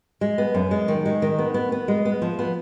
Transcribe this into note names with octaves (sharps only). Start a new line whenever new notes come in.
G#3
B3
F#2
G#3
D#3
G#3
D#3
B3
B3
B3
G#3
B3
F3
B3